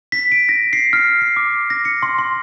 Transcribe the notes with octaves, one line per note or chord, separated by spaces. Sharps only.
B6
D7
A#6
C7
F6
C7
D6
A#6
C#7
C6
C6